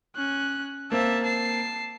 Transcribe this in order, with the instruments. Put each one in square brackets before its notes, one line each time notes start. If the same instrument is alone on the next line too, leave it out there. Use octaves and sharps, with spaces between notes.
[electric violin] C#4 F#6
[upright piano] A#3 C4 [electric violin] E5 A5
[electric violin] A5 C7